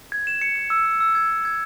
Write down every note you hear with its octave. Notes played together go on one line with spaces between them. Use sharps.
G#6
E7
C#7
C#7
E6
E6
E6
G#6
E6
G#6